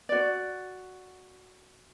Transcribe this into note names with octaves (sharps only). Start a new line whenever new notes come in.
F#4 D5